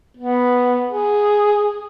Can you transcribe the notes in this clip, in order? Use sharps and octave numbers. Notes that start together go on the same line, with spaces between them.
B3
G#4